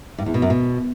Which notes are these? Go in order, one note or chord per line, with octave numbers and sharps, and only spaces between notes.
G2
E2
B2
F#2
B2